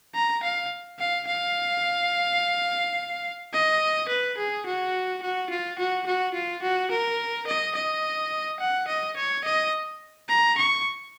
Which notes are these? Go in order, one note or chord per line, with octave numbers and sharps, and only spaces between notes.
A#5
F5
F5
F5
D#5
B4
G#4
F#4
F#4
F4
F#4
F#4
F4
F#4
A#4
D#5
D#5
F#5
D#5
C#5
D#5
A#5
C#6